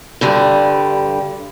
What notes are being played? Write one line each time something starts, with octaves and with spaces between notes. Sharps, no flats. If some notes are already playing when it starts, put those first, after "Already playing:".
G2 D3 G3